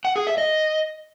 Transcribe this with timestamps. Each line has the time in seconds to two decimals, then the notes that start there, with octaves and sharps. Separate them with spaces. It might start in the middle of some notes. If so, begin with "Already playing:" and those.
0.05 F#5
0.16 G#4
0.27 E5
0.38 D#5